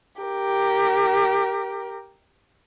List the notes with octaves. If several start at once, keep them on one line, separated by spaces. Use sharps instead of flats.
G4 A#4